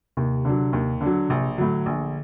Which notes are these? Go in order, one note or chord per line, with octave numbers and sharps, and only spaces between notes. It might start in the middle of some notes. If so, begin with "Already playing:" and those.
D#2 C3
D3 F#3
D#2
D3
F#3
A#1 C3
A2 D3 F#3
A#1